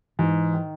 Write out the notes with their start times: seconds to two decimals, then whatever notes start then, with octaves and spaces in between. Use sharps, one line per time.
0.19 G#2 E3
0.54 D#3